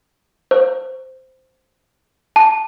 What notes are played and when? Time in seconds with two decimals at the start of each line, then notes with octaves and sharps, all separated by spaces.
0.51 C5
2.36 A5